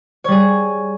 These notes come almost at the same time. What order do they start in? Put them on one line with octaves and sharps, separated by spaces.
C#5 G3 G#4